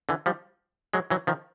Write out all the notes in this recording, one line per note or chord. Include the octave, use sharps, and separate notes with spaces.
D3 E3
F3 G3
F#3 G#3
E3 F#3
D#3 F3